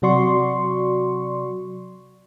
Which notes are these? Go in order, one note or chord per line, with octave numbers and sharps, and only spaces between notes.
C3 F#3 F#4 D5 C6 C#6